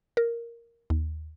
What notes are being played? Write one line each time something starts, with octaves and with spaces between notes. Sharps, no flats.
A#4
D#2